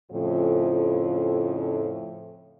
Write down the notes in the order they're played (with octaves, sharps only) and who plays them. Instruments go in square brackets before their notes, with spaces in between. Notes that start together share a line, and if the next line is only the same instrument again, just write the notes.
[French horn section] F2 A2 C#3 F3